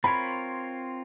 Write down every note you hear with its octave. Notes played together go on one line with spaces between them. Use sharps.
C4 F4 A#4 C#5 B5